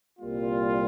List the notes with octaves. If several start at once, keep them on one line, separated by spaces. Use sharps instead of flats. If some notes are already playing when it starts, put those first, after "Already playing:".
C2 A#2 G3 A#3 F4